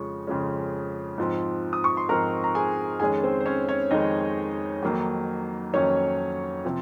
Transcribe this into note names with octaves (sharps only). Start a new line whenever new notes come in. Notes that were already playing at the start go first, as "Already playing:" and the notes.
Already playing: F2 C#3 F3 G#3 C#4 C#6
F2 C#3 F3 G#3 C#4
G#2 F3 C4
D#6
C#6
C6
G#2 F3 C4 A#4 A#5
A#5
G#4 G#5
F2 D#3 G#3 C#4 G#4 G#5
C4 C5
C5
C#4 C#5
C#4 C#5
F2 D#3 G#3 C#4 D#4 D#5
F2 D#3 F#3 A#3 D#4
F2 D#3 F#3 A#3 C#4 D#4 C#5
C3 F3 C4